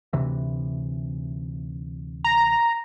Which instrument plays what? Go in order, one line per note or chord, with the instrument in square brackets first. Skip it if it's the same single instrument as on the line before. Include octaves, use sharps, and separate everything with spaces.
[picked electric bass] D2 C3 E3
[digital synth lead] A#5